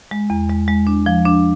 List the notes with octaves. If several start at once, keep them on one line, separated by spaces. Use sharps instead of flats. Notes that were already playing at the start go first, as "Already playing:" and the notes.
G#3
E2
G#3
G#3
D4
F3
D4